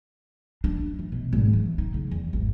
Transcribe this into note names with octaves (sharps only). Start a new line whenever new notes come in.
D4
E3
B2
G#1
E3
D#4
C#3
E2
G#1